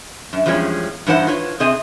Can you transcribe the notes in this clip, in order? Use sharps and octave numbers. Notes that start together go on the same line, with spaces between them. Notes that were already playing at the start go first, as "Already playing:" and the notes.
F#2
E2 F3 G3 G#3 C#4
G2 E3 D#4 C5 F#5
F4 B4 C#5
C3 C4 G#4 D#5